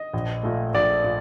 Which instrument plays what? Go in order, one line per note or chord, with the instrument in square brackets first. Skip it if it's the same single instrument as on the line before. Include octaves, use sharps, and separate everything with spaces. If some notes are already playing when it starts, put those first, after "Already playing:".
Already playing: [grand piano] D#5
A#1
A#2 A3
A#1 D5
A#2